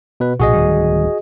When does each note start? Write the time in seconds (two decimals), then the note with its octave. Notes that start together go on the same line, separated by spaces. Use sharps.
0.20 B2 B4
0.40 B1 A#2 F#4 G#4 D#5
0.53 D1 D#3 G3